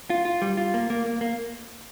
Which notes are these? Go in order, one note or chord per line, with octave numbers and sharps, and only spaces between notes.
F4
F4
G3
F4
A#3
A#3
A#3
A#3